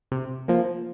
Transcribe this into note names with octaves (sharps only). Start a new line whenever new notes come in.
C3
F3 A#3